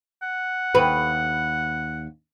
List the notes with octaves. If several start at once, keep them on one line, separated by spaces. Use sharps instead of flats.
F#5
D#2 B4